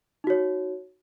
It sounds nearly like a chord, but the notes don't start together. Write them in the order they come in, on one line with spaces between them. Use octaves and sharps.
D#4 F#4 C#5